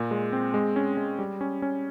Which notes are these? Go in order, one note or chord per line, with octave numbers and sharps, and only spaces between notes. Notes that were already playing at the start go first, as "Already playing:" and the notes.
Already playing: A#2
G#3
C4
G#3
C#4
G#3
G3
C#4
C#4